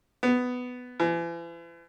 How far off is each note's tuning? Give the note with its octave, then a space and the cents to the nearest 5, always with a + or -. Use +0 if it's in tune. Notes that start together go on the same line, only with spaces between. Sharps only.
B3 +10
E3 +40